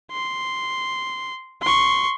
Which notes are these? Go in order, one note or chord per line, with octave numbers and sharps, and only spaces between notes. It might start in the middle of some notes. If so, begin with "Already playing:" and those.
C6
C6 C#6